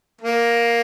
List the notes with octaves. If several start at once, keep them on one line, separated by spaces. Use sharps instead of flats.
A#3